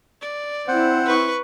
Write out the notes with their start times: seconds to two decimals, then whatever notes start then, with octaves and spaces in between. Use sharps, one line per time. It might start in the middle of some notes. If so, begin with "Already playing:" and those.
0.22 D5
0.68 C4 E4 C5 F#5
1.06 B4 C#6